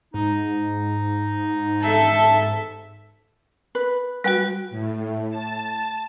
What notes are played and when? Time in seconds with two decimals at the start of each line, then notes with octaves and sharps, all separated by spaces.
0.14 G#2 D#4
1.82 A4 E5 A5
3.75 B4
4.24 G3 F#4 B4 G5
4.71 A2
5.30 A5